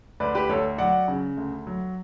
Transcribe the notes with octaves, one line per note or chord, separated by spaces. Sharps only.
D2 B4 D5
G4 B4
D2 A4 C#5
F#3 D5 F#5
C#3
D2
F#3